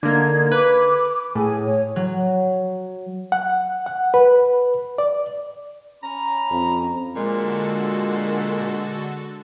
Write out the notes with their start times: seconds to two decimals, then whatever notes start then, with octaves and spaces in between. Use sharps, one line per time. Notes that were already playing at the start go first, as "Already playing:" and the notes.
0.03 D3 A#3 D#4 G#6
0.52 B4 D6
1.35 A2 G#4 G#5
1.64 C#5
1.96 F#3
3.32 F#5
3.86 F#5
4.14 B4
4.98 D5
6.04 C#4 A#5 B5
6.51 F2
7.16 A#2 D3 G#3 F#4 A4